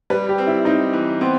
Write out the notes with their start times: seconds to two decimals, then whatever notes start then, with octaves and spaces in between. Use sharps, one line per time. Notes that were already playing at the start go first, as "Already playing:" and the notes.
0.10 G3 B4
0.29 G4
0.38 C4
0.47 E4
0.65 C4 D#4
0.93 E3
1.21 B3 C4